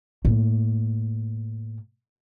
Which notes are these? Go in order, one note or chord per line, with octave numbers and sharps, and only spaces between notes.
A2 A#3